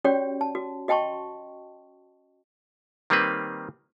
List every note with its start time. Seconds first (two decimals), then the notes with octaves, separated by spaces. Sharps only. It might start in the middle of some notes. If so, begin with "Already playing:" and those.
0.04 C#4 F#4 G4 C#5 D5 G5
0.41 A5
0.55 F#4
0.88 F#4 D#5 G5 A5 C6 C#6
3.10 D#3 G3 A#3 C4 B4